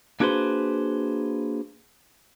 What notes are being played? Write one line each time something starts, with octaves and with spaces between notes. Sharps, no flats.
A#3 D4 F#4 G#4 B4 C5